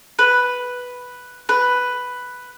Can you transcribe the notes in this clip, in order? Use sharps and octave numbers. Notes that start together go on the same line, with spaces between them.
B4
B4